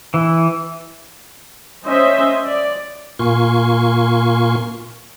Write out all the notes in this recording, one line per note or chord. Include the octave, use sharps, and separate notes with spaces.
E3
C#4 C5 D#5 E5
D5
A#2 A#3 F4 G#5 C6 C#6